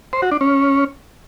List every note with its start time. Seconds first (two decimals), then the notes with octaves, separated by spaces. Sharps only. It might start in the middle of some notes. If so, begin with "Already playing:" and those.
0.13 C5
0.22 F#4
0.31 D4
0.41 C#4